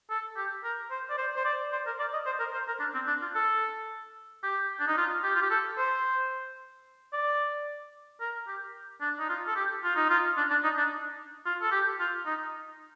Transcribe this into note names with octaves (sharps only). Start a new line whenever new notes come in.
A4
G4
A#4
C5
D5
C5
C5
D5
C5
A#4
D5
D#5
C5
A#4
C5
A#4
D4
C4
D4
F4
A4
G4
D4
D#4
F4
G4
F4
G4
A4
C5
D5
A#4
G4
D4
D#4
F4
A4
G4
F4
D#4
F4
D4
D4
D#4
D4
F4
A4
G4
F4
D#4